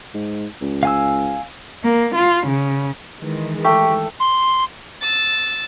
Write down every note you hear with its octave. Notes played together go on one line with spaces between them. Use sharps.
G#2
C#2
F5 G#5 E6
A#3
F4
C#3
D#3 E3 G#3
A3 G4 C#6
C6
E6 A6